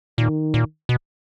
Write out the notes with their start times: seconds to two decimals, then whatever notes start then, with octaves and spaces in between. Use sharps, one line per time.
0.18 A#2 D#3
0.54 A#2
0.89 B2